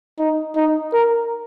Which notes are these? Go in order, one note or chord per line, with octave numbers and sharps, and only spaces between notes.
D#4
D#4
A#4